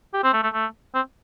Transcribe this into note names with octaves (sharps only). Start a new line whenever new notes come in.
G4
C4
A3
A3
A3
C4